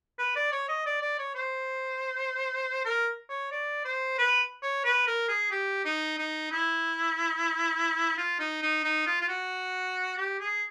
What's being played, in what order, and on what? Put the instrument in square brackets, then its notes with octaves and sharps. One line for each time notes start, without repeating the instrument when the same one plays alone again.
[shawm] B4
D5
C#5
D#5
D5
D5
C#5
C5
A#4
C#5
D5
C5
B4
C#5
B4
A#4
G#4
G4
D#4
D#4
E4
F4
D#4
D#4
D#4
F4
F4
F#4
G4
G#4